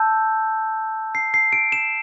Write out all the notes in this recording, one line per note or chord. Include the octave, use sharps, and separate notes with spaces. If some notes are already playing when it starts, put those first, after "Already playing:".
Already playing: A5 E6 G6
C7
C7
D7
E7